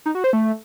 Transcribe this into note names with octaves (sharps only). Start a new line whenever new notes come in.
D#4
F#4
C5
A3